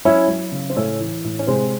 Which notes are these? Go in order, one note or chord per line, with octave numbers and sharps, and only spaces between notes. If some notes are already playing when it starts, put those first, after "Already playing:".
F#3 C#4 E4
F#3
C#3
C4
A2 A3 C#4
E3
A2
C#4
C3 G#3 C4